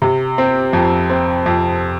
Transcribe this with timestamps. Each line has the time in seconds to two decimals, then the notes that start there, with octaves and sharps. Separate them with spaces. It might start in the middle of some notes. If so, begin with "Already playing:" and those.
0.02 C3
0.38 C4
0.73 F2
1.10 C4
1.46 F2